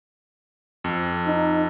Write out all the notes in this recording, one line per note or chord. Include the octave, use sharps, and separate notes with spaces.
F2
D#4